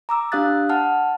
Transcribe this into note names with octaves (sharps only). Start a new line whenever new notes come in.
A#5 D6 E6
D4 G4 F5 D#6 F#6 A6
F#5 A5 F6